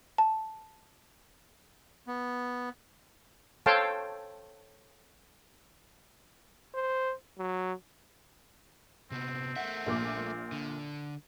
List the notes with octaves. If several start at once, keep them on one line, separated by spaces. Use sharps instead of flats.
A5
B3
A4 C5 C#5 F5 G5 A5
C5
F#3
C3 B3 C4
A3 A#4 E5 F#5
A#1 A#2 D6
D3